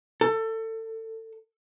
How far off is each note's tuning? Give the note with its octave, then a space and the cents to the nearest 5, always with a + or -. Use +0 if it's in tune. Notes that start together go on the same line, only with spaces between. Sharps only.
A4 +25